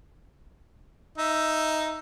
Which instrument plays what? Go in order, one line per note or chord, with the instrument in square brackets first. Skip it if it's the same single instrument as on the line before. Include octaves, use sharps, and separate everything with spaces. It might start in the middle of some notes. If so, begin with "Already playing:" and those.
[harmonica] D#4 E5